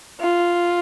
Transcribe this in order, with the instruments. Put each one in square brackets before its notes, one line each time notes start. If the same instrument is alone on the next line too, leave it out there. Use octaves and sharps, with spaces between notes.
[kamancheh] F4